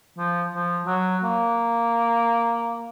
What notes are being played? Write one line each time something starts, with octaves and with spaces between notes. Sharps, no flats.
F3
F3
F#3
A#3